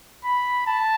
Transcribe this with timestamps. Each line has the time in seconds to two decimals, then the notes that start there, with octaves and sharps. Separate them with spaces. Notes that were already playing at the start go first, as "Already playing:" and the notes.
0.25 B5
0.67 A5